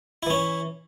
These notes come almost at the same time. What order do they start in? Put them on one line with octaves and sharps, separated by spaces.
E4 E3 C#4